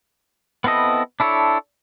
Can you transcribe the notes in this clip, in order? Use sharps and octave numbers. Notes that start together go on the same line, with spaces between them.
B3 C4 E4 A4 D#5
D4 E4 A4 C#5